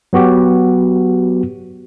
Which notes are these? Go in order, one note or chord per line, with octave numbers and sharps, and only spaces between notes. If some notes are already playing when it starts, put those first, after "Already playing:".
F#3 B3 F#4 G4